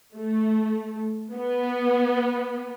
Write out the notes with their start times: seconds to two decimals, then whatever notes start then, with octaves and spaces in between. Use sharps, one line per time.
0.15 A3
1.34 B3